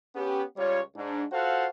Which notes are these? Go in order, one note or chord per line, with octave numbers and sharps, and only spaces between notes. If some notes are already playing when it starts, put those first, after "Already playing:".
B3 C#4 G4
C#2 G3 F4 C#5
G#2 D4
F4 F#4 A4 C5 F5 F#5